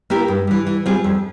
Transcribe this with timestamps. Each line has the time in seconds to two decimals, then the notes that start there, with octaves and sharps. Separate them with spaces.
0.10 A#3 E4 G4 A#4
0.28 G2
0.47 E3 G3
0.66 E3
0.86 G3 C4 F4 G#4
1.04 F2